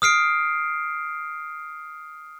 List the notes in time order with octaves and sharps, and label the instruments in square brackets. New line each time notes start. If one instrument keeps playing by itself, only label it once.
[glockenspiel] D#6 F6 C7 D7